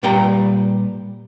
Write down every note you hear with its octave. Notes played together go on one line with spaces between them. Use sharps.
A#2 G3 B4 G5 A#5